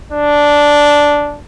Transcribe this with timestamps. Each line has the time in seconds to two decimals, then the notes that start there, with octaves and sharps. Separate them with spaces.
0.12 D4